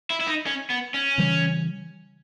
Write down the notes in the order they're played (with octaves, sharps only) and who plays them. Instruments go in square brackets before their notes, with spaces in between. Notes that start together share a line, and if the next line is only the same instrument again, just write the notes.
[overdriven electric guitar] E4
E4
D#4
C#4
B3
C#4
[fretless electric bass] C#3 E3 G3